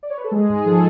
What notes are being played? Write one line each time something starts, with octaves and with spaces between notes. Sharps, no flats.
D5
C#5
B4
A4
G#3 G#4
G#2
G#4
F3 A4